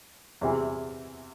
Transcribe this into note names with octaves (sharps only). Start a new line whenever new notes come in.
E2 C3 E3